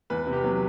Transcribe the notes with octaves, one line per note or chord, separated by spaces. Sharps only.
E2 B4
C3
G4
F#3